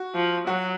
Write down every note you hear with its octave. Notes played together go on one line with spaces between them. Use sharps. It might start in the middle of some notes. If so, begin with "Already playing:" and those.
Already playing: F#4
F3
F#3 F#4